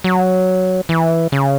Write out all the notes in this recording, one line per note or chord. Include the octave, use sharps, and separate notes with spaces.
F#3
E3
C#3